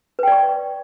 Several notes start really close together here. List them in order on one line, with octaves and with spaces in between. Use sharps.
B4 G5 D5 C#6